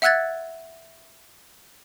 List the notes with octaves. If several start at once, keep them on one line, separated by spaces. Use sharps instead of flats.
E5 F#5 E6 F#6 G#6 A6